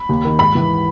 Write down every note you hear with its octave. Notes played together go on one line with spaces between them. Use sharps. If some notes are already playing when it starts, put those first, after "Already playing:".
Already playing: B5
D#2
D#3
G#2 B5
E3